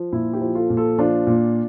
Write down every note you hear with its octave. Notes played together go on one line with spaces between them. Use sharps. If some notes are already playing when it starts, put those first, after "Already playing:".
Already playing: F3
A#2 E4
E4 G4
F3
F4 A4
A#2
F4 A4
F3 D4 F4
A#2